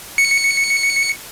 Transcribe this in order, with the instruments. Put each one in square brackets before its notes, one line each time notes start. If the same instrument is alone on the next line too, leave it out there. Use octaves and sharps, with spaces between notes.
[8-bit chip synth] C#7